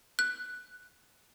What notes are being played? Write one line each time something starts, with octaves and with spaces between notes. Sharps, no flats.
F#6